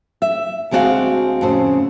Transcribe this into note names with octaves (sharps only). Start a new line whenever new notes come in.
E5
D2 G#3 C4 D4 F#4 F5
F2 A2 C#3 C5